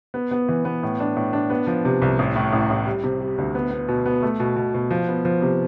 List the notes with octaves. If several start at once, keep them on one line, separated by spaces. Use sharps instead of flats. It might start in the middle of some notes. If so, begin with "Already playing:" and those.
B3
B3
E3
B3
A2
D4
A2
D4
B3
F3
C3
C2
A1
A2
A1
A1
G3
C3
G3
D2
B3
B3
B2
B3
A3
B2
B2
B2
F3
B3
F3
C3